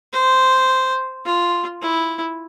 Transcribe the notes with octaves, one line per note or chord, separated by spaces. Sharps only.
C5
F4
E4